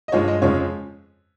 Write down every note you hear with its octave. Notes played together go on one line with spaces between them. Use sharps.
D#5
G2 F3 G#3 C#5
D#5
F2 C#3 F3 G#3 C#5